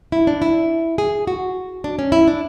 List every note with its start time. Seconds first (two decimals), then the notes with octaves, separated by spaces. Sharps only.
0.12 E4
0.27 D4
0.42 E4
0.98 G#4
1.27 F#4
1.84 D4
1.99 C#4
2.12 E4
2.27 D4